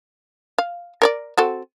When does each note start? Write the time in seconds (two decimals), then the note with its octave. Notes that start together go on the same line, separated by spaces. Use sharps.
0.58 F5
1.02 A#4 C#5 D5
1.38 C4 F#4 A4